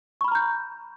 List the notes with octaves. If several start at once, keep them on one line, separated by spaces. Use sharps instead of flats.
A#5 B5 C#6 F6 G6